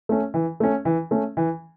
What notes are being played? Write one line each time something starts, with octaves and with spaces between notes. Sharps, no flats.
A3 C#4
E3
A3 C#4
E3
A3 C#4
E3